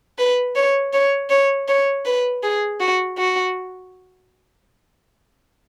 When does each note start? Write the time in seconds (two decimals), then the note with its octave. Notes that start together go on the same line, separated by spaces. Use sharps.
0.18 B4
0.55 C#5
0.93 C#5
1.30 C#5
1.68 C#5
2.05 B4
2.43 G#4
2.80 F#4
3.18 F#4